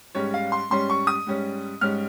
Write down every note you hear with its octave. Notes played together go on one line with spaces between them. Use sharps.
G#2 G3 C#4 C#5
F5
C6
G#2 G3 C#4 C6
C#6
D#6
G#2 G3 C#4
G#2 G3 C#4 F6